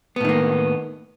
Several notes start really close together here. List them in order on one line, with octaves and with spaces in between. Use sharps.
B3 A2 D#3 A#3